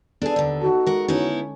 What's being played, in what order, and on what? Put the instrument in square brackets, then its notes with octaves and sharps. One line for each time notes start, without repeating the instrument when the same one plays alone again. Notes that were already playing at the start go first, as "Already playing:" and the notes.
[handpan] B3 A4 [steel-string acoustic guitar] D4 G#4
[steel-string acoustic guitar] D#2 D3
[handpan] D#4 A4 [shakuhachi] F#4
[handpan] G#3 [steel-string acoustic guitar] A#4 F#5
[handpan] D3 C#4 [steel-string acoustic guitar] B3 D#4 E4